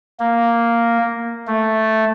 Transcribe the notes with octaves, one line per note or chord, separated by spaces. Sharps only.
A#3
A3